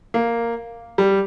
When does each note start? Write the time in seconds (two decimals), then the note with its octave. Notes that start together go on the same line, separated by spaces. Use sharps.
0.14 A#3
0.98 G3